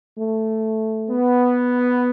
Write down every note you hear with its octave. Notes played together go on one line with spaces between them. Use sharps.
A3
B3